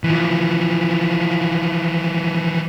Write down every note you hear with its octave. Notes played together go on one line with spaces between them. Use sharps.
E3 F3